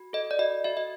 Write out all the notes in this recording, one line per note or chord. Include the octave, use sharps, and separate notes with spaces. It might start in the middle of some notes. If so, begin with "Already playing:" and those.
Already playing: F#4
A4 D#5
D5
F#4 D#5
F#4 E5
D#5